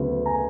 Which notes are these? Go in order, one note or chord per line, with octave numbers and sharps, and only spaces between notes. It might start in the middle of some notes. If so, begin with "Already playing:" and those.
Already playing: D2 C#3 F#3 B3
G#5 A#5